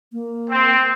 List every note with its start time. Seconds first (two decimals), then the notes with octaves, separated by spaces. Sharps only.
0.13 A#3
0.50 C4